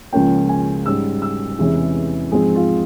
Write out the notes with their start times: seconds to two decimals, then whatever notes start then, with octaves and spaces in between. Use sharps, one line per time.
0.13 C#2 C#3 F3 A#3 C#4 G5
0.49 G#5
0.85 G#2 G3 C#4 E6
1.22 E6
1.58 E2 C3 E3 G#3 C#4
2.31 G#2 F3 G#3 C4 G#4
2.56 F4